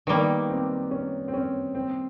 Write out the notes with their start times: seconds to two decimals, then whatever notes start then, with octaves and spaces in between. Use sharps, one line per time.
0.07 D#3 G3 A#3 B3
0.50 C4
0.91 C#4
1.28 C4
1.34 C#4
1.75 C4